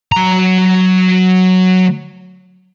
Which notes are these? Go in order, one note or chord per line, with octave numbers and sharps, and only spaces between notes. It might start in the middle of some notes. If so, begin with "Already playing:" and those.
F#3 A#5